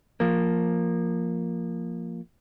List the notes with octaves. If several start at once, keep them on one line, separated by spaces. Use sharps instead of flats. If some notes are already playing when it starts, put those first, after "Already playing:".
F3 A#3